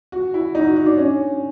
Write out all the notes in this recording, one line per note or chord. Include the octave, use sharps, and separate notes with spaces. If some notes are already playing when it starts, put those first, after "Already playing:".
F#4
E4
D#4
F#4
F#4
D4
C#4